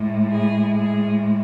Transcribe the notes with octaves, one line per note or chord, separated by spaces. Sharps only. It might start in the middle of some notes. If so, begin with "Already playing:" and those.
Already playing: A2 G#3
G#4
G#4